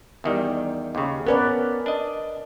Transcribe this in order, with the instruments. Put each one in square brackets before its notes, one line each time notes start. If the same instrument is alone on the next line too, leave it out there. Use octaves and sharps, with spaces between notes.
[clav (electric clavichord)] E2 D#3 G3
D#2 C#3
[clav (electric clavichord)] B3 C#4 [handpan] A#4 B4 D5
[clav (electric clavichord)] D4 D#5